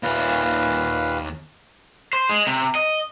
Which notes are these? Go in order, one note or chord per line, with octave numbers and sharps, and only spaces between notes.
D#2 A#2 B4 F5 F#5
C5
G#3
C3
D#5